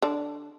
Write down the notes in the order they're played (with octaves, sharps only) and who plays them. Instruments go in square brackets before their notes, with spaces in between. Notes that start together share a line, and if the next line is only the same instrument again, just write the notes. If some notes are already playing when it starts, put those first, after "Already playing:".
[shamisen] D3 D4